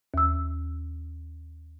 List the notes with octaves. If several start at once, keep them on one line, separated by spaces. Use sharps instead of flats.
D#2 E6